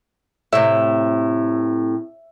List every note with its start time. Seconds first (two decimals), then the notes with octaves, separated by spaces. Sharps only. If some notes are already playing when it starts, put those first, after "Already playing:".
0.52 A2 C3 E5